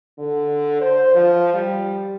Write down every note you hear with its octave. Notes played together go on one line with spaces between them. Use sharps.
D3
C5
F3
G3